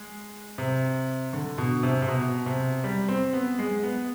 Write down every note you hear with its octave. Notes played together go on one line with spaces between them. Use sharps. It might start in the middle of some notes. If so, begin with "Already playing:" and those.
Already playing: G#3
C3
D3
B2
C3
C3
B2
C3
G3
C4
B3
G#3
B3